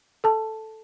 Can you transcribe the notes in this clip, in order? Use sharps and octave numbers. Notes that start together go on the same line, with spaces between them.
A4 A5